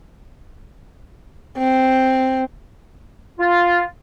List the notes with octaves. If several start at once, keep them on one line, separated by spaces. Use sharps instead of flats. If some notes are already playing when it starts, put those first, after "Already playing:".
C4
F4